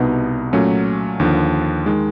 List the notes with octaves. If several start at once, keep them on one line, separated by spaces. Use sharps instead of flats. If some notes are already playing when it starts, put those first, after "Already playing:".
Already playing: C2 B2 G3 B3 D#4
A#2 F#3 A3 C#4
D#2 D3 F3
D#3 G#3